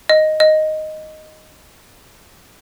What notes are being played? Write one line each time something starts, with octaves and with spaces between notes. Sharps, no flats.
D#5
D#5